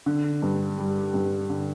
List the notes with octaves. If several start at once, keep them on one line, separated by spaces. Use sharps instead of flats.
D3
G2
G3
G2
D3